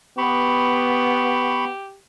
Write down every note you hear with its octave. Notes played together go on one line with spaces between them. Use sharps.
B3 G4 B5 C#6